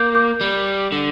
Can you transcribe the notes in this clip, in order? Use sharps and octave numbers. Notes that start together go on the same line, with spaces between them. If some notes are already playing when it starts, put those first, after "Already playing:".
Already playing: A#3 D6 G6
D6 G6
G3
D3